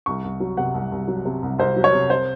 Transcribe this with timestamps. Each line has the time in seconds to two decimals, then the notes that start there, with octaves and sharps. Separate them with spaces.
0.06 C2 C#6
0.24 C2
0.40 F#3
0.57 C3 F#5
0.74 C2
0.92 C2
1.08 F#3
1.25 C3
1.42 C2
1.59 C2 C5
1.76 F#3
1.84 C#5
1.93 C3
2.10 C5